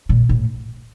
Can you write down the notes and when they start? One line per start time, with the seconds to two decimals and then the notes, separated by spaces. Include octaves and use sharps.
0.09 A#2
0.29 A2